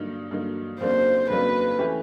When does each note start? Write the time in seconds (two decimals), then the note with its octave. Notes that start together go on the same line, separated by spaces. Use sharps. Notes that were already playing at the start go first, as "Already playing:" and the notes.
Already playing: G2 D3 F#3 A#3 D#4
0.31 G2 D3 F#3 A#3 D#4
0.80 F2 C#3 F#3 A#3 D4 C5
1.30 F2 C#3 F#3 A#3 D4 B4
1.79 E3 A3 C#4 E4 G4